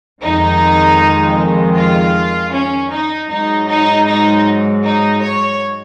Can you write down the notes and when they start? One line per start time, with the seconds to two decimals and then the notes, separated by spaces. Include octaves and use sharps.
0.21 F2 D#3 G#3 D#4
1.76 F4
2.53 C#4
2.91 D#4
3.30 G#2 F#3 D#4
3.69 D#4
4.07 D#4
4.83 D#4
5.22 C#5